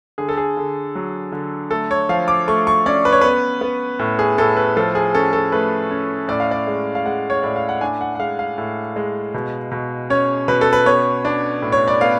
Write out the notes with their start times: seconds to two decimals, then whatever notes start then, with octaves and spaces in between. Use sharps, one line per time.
0.18 D3 G#4
0.29 A4
0.37 G#4
0.57 D3
0.95 F#3
1.32 D3
1.71 A3 A4
1.91 C#5
2.09 F3 F5
2.28 D6
2.48 A3 C#6
2.67 C#6
2.86 C#4 D5
3.05 B4
3.12 C#5
3.21 B3 B4
3.61 B3
3.99 A2
4.19 G#4
4.38 A2 A4
4.57 B4
4.77 F3 A4
4.95 G#4
5.15 C#4 A4
5.33 A4
5.52 A3 B4
5.91 C#4
6.28 A2 D5
6.40 F5
6.51 D5
6.67 G#3
6.95 F5
7.05 G#3 F#5
7.30 C#5
7.43 A2 D5
7.56 F5
7.69 F#5
7.81 D4 G#5
8.01 F#5
8.15 F#5
8.19 G#3 F5
8.39 F5
8.58 A2
8.96 G#3
9.34 B2
9.71 B2
10.10 C#4 C#5
10.48 B2 B4
10.61 A4
10.73 B4
10.86 B3 C#5
11.25 D4
11.62 A2
11.72 C#5
11.88 D5
12.01 B3 F5